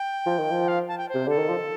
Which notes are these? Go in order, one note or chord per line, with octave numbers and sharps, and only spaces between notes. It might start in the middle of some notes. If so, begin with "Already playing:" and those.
Already playing: G5
F3
D#3
F3
F5
A5
G5
C5
C3
D3 A4
D#3
F3